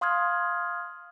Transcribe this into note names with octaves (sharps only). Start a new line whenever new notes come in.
F5 C6 D#6 F6 G#6